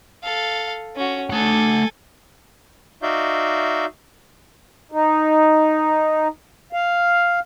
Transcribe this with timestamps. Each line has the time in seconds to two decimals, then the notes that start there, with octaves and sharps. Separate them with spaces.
0.23 A4 F5
0.96 C#4 F#4
1.30 A3 A4 F#5 G#5
3.02 D#4 F#4 D5 E5 F5 G6
4.92 D#4
6.73 F5